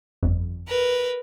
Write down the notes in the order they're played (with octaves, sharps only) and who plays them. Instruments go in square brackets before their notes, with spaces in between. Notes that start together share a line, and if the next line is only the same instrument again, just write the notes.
[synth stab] G1 F2
[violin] A#4 B4